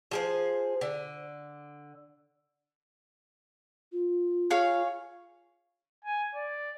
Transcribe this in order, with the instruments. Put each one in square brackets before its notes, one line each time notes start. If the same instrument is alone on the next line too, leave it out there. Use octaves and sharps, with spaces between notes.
[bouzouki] F3 G#4 C5
D3
[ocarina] F4
[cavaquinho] G#4 C#5 F5
[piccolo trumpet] G#5
D5